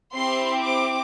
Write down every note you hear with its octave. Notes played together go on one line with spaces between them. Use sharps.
C4 E4 G4 C6
D6